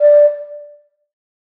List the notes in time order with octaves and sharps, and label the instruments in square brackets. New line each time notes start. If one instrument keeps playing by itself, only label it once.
[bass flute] D5